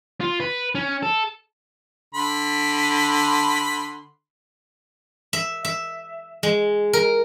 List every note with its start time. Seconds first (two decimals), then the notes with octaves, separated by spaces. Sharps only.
0.21 F4
0.40 B4
0.75 C#4
1.03 A4
2.15 D3 B5 C6
5.33 E5
5.65 E5
6.43 G#3
6.93 A#4